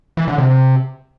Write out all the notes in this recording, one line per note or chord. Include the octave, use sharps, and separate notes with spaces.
E3
D3
C3